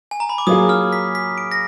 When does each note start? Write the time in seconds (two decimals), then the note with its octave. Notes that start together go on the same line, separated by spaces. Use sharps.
0.11 G#5
0.20 A#5
0.29 B5
0.38 D6
0.47 F#3 A#3 F4 G#4 D#6
0.69 F6
0.93 B6
1.15 B6
1.38 D7
1.52 A#6